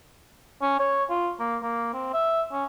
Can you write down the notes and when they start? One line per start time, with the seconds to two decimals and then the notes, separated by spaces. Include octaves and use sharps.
0.62 C#4
0.79 C#5
1.09 F4
1.39 A#3
1.62 A#3
1.93 C4
2.13 E5
2.52 C#4